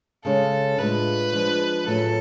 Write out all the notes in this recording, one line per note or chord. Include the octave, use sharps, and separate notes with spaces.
C#3 G#3 C#4 A4
A2 G#3 D4 F4 B4
F3 G#3 D4
A2 F#3 C#4 F4 G#4 A4